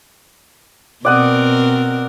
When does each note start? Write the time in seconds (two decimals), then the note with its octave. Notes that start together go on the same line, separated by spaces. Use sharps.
1.05 B2 C4 A#4 D5 F#5 D#6